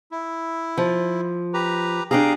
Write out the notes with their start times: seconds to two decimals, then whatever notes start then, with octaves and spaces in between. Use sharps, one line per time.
0.11 E4
0.77 F3
1.54 G4 B4 A#5
2.11 D4 G4 G#4 F5 A#5